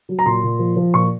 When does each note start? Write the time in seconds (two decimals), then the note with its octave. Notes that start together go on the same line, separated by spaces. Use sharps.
0.09 F#3
0.19 A#5
0.26 A#2 C6
0.43 A#2
0.59 F3
0.76 F3
0.94 A#2 C#6